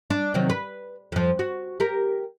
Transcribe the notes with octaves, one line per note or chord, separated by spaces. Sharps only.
D4
C3 D#3 F#3
B4
F2 F3
F#4
G4 A#4